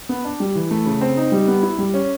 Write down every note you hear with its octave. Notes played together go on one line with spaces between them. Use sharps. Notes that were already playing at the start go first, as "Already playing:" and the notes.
B3
D4
G3
E3
A3
C#3
C4
D#4
G3
B3
E4
G3
C#4